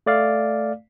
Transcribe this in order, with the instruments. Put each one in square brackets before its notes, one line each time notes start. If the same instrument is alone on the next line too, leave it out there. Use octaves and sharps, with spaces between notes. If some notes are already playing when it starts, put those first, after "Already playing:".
[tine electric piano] A3 D5 F5